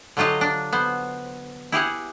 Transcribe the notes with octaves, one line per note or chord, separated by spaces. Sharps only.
D3 F#3 F4 G4 D#5
D4
B3 C5
E4 G4 G#4 F#5